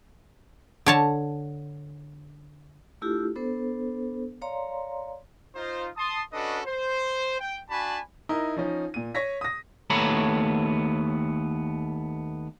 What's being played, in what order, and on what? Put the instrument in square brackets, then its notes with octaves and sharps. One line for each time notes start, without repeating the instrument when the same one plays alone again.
[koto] D3 C#5 A5
[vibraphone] A3 D4 E4 F4 G4 A4
B3 D4 A4 C5
C#5 D5 F5 A#5 C6
[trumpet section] D#4 F4 C5
A5 C6 D#6
C#4 D4 F#4 A4 B4 D#5
C5
G5
D4 F#4 G#5 A5 B5
[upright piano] D#4 E4 A#4 D#5
F3 C#4 D#4
A#2 D#7
C#5 C#6 A#6 B6
D#6 A#6
[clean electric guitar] D#2 A3 B3 C#5 A#5 B5